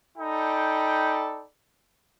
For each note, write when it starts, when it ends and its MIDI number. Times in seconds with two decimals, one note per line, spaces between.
0.18 1.43 63
0.18 1.43 69
0.18 1.43 74
0.18 1.43 79
0.18 1.43 83